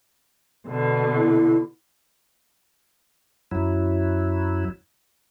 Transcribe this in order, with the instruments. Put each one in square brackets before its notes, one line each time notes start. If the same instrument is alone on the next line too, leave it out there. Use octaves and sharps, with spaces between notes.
[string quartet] B2 D3
[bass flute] E4
[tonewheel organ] F#2 F#3 E4